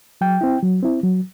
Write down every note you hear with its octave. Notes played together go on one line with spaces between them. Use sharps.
F#3 G5
C4 E4
F#3
C4 E4
F#3